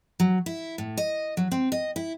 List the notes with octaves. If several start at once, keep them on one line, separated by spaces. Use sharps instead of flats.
F#3
E4
A2
D#5
F#3
C4
D#5
E4